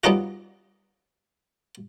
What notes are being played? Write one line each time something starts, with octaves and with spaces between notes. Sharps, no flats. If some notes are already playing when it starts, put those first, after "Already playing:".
G3 B3 C#4 D#4 F4 F#4